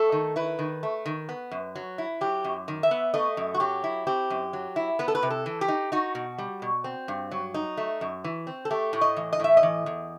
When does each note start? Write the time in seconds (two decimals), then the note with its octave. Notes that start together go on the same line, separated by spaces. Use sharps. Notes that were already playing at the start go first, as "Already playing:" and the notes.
Already playing: A3 A4
0.12 D#3
0.36 E4 B4
0.59 D#3
0.83 A3
1.06 D#3
1.29 B3
1.51 F#2
1.76 F#3
1.98 E4
2.21 F#3 G4
2.44 F#2
2.68 D#3
2.83 E5
2.91 B3
3.14 A3 D#5
3.37 F#2
3.54 F#4
3.60 F#3 G4
3.84 E4
4.07 C4 G4
4.30 F#2
4.53 F#3
4.76 E4
4.99 B3 B4
5.08 A4
5.15 B4
5.23 C3
5.30 A4
5.46 E3
5.61 G4
5.68 D#4
5.92 D#4 F#4
6.15 B2
6.38 G3
6.62 B2
6.84 C4
7.08 G2
7.31 F#3
7.54 D#4
7.77 A3
8.01 F#2
8.24 E3
8.47 C4
8.65 A4
8.71 A3 G4
8.93 A2
9.01 D#5
9.17 E3
9.33 D#5
9.40 A2 E5
9.57 D#5
9.63 E3
9.86 E2